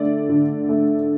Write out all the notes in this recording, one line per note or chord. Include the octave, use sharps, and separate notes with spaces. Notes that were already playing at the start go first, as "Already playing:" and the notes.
Already playing: D3 A3 D5
D3
A3